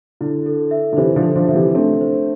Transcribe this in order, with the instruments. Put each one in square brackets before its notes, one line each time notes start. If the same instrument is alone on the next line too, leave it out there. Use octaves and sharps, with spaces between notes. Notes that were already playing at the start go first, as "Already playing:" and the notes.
[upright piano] D3 [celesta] E4
[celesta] A4
E5
[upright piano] D3
[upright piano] C3 E3 [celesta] C5
[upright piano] D3 F3
[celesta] C5
[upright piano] D3 F3
[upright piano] F3 [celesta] E5
[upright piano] C3 E3
[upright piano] A3 C4 [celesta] D4
[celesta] C5